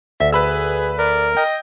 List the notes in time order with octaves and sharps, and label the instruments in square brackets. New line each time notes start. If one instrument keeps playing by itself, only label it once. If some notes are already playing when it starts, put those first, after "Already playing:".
[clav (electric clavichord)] D2 [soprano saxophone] E5
[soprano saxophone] G#4 [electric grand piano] B4 B5 E6
[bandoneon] A#4 [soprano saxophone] D5
[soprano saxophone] D#5 [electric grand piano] G5